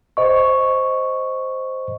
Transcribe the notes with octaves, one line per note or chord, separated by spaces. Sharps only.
C5 D#5 C#6